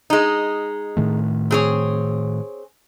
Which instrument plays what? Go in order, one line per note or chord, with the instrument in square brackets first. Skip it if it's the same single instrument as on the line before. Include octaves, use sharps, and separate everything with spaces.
[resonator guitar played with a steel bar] G#3 D#4
[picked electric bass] A2 D#3 A3
[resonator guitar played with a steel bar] C4 G#4 C#5